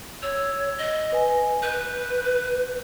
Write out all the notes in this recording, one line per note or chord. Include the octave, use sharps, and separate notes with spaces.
C#5 E6
D#5
B4 G#5
B4 G6